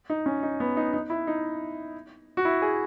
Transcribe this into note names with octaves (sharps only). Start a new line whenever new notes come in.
D#4
C#4
D#4
B3
D#4
D#4
E4
D#4
F#4
E4
G#4